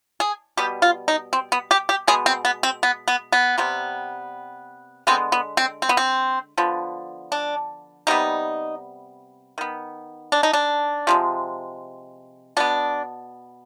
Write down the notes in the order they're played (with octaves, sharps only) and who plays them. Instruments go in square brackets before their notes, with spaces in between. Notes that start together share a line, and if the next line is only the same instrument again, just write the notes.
[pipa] G#4
B2 G3 B3 G4
F4
D#4
C4
B3
G4
G4
B2 G#3 B3 G#4
C4
B3
C4
B3
B3
B3
C3 G3 B3
D3 G#3 B3 C4
B3
C4
C4
B3
C4
D3 F3 B3
D4
C3 G3 B3 D#4
D#3 B3
D4
D#4
D4
C3 F3 G#3
B2 B3 D4